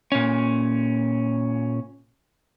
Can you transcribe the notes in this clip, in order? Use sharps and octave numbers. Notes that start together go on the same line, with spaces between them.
A#2 C#4